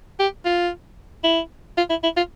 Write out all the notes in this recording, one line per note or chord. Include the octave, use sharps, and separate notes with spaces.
G4
F4
E4
F4
E4
E4
F4